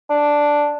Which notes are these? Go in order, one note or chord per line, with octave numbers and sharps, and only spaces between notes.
D4